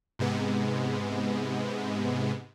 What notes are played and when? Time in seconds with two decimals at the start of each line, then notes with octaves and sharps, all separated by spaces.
0.19 G#2 C3 G#3 B3